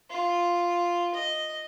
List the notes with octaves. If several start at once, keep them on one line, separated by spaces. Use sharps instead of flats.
F4
D#5